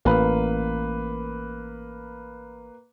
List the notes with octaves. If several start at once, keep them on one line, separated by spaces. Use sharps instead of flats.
A1 A#3 B4